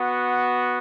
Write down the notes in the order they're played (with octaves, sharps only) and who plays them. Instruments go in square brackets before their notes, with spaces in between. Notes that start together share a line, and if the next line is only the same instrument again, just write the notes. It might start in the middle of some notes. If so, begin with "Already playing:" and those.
Already playing: [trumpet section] B3 F#4